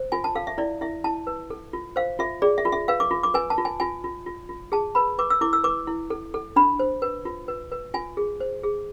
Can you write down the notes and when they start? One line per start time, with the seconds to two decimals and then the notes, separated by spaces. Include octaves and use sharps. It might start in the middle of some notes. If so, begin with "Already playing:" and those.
Already playing: C5
0.12 F4 G#5
0.24 A5
0.35 A4 F5
0.47 E5
0.58 E4 D5
0.81 E4 E5
1.04 E4 A5
1.27 B4
1.50 A4
1.73 F4
1.96 C5 F5
2.19 F4 E5
2.42 G#4 D5
2.58 E5
2.65 F4
2.72 E5
2.88 B4 F5
3.00 D6
3.11 F4
3.23 D6
3.34 B4 G#5
3.50 A5
3.58 F4
3.65 G#5
3.80 F4 G#5
4.04 F4
4.26 F4
4.49 F4
4.72 G#4 A5
4.95 B4 B5
5.19 B4 D6
5.30 E6
5.41 E4 D6
5.53 E6
5.64 B4 D6
5.87 E4
6.10 A4
6.34 A4
6.56 D4 B5
6.79 C5
7.02 B4
7.25 F4
7.48 B4
7.72 B4
7.94 F4 G#5
8.17 G#4
8.40 C5
8.64 G#4